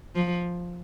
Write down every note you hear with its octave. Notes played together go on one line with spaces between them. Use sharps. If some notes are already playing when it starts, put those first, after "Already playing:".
F3